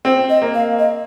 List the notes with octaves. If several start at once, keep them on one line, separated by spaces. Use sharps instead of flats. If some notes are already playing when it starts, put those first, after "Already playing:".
C4 C5
D#5
A#3
F5
D#5